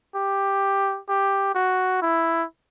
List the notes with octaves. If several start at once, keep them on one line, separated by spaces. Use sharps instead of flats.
G4
G4
F#4
E4